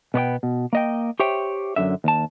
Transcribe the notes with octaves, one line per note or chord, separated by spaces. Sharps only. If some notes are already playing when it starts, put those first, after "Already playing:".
B2 B3 D5 G5
B2
A#3 D#5 G5
G4 C5 C#5 E5 G5
F#2 B2 D3 E5
D#2 A5